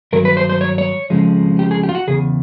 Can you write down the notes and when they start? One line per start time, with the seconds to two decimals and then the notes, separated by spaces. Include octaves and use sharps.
0.13 G2 D#3 F#3 A#4
0.25 B4
0.37 C5
0.49 C5
0.61 C#5
0.78 C#5
1.10 F2 C#3 F3 G#3
1.59 G4
1.71 G#4
1.83 G4
1.89 F4
1.95 F#4
2.07 E2 C#3 G#4